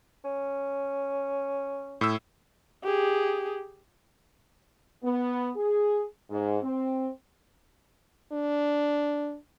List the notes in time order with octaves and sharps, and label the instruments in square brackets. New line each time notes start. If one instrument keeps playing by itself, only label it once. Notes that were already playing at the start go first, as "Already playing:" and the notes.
[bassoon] C#4
[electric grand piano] A2 E6
[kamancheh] G4 G#4
[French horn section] B3
G#4
G#2
C4
[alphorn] D4